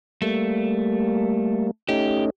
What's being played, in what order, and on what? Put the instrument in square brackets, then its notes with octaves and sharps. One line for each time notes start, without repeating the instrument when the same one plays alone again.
[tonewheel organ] G3 A#3 [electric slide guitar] A3
[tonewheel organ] A3 C#4 D#4 [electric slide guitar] G4